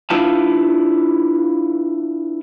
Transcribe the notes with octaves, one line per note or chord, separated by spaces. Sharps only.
D4 E4 F4 B4 F5 A5